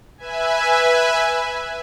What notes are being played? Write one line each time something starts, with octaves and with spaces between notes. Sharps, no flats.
B4 E5 G#5